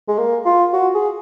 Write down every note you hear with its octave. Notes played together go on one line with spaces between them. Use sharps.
G#3
A#3
F4
F#4
G#4